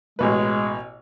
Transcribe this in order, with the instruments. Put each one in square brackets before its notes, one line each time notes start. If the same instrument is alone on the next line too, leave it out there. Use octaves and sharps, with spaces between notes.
[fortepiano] A1 B2 B4 [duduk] G#3